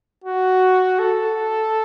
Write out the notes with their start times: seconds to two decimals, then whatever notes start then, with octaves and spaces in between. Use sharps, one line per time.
0.24 F#4
0.99 A4